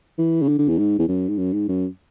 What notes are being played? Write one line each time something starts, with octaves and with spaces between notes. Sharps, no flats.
E3
C#3
D3
D3
E2
G#2
E2
F#2
G#2
F#2
G#2
F#2